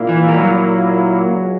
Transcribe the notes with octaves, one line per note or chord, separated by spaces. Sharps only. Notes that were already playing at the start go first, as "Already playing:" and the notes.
Already playing: A#2 A#3 E4
E3
G3
F#3
C#2 C#3